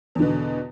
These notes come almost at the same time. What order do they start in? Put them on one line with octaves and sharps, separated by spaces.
E2 D3 B2